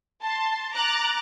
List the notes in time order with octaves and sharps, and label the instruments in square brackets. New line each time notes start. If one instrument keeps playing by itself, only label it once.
[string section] A5 C6
A#5 D6 F#6 A6